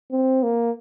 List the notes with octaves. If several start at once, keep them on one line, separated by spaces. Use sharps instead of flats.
C4
A#3